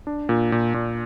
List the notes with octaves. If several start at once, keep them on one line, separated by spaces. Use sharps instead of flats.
D4
A#2
A#2
A#2